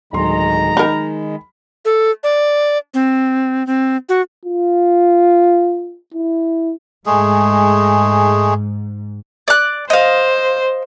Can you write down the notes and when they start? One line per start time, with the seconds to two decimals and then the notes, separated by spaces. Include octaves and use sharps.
0.13 D1 D#3 G#3 A#5 C6
0.77 D#4 A#4 B5
1.85 A4
2.24 D5
2.94 C4
3.67 C4
4.09 F#4
4.45 F4
6.14 E4
7.06 G#2 G#3 A3 G#4
9.48 D5 F#6
9.90 C5 D#5 F5